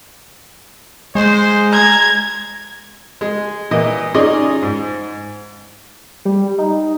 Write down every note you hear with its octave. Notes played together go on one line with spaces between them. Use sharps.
G#3 C5
A#5 G#6
G#3
A#2 E3 D#5
C#4 D#4 F4 G#4 D5 D#5
G#2
G3
D#4